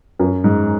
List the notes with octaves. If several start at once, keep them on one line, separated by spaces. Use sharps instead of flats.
F#2
G#2